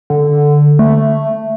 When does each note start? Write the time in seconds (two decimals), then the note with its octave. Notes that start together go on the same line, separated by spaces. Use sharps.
0.10 D3
0.79 A3